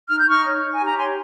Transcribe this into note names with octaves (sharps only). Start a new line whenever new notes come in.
D#4 F6
G6
D#4 C#6 F6
C#5
D#4
G#5
G4
A#5
C#5 G#5 C6